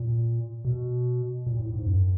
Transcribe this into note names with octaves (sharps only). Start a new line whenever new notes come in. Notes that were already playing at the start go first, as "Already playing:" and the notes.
Already playing: A#2
B2
A#2
A2
G#2
F#2